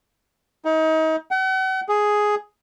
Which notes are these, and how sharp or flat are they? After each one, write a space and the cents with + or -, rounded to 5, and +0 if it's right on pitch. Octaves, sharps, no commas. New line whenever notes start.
D#4 +35
F#5 +40
G#4 +5